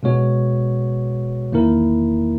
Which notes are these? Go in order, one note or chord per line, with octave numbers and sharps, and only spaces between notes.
B2 G#3 B3 F#4 C#5
E2 D#3 A#3 E4 A#4